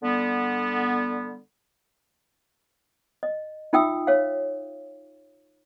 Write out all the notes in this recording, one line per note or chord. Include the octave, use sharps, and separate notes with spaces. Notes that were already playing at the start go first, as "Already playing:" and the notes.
D3 G3 B3
D#5
D#4 F4 E5 G5 D#6 E6
C#5 F5